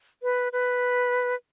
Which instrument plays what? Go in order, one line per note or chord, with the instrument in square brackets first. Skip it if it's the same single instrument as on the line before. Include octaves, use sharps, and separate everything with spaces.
[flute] B4
B4